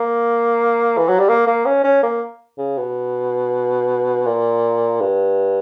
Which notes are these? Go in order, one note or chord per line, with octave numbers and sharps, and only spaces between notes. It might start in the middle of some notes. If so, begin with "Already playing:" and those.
Already playing: A#3
E3
F#3
G3
A#3
A#3
C#4
C#4
A#3
C#3
B2
A#2
G2